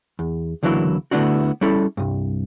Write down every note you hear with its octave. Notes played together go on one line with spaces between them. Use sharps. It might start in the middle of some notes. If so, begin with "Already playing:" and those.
E2
C#2 D3 E3 F#3 A#3 E4
D3 A3 B3 D4 E4 F#4
G3 C#4 E4 A4
C2 G2